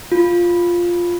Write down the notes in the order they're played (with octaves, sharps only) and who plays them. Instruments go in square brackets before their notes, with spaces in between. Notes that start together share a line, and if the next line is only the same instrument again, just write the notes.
[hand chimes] F4